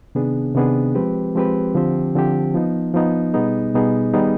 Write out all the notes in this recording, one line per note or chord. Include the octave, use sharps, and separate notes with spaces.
C3 D#3 B3 D4 G#4
C3 D#3 B3 D4 G#4
F3 G#3 C4 G4 B4
F3 G#3 C4 G4 B4
D3 F3 C4 G4
D3 F3 C4 G4
F3 B3 D#4
F3 B3 D#4
B2 G3 B3 D#4 G#4
B2 G3 B3 D#4 G#4
D#3 G3 B3 D#4 G#4